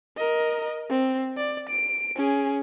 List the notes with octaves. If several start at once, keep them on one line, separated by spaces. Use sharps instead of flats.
A#4 D#5
C4
D5
D7
C#4 G#4